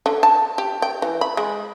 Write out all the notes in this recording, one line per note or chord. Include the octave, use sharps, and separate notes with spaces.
D3
A5
G4
G5
E3
B5
G#3